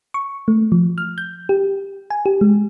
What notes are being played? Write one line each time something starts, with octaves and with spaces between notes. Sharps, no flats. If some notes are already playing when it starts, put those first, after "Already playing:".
C#6
A3
F3
F6
G6
G4
G#5
G4
G#3